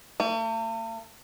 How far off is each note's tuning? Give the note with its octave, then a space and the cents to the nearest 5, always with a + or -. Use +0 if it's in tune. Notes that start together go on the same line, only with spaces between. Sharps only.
A3 +45